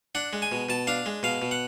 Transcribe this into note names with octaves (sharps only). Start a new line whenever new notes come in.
D4 F#5
G#3
G#5
B2
B2 A5
D4 F5
G#3
B2 F5
B2
F#5